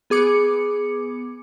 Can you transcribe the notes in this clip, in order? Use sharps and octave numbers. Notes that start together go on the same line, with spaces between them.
B3 G#4 D6 C#7